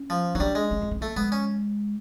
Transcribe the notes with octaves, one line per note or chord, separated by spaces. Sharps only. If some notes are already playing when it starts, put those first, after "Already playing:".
Already playing: C#4
F3
F#3 D#4
G3 D4
G#3
C#4
C#4
B3
A3 A#3
G#3 B3
C#4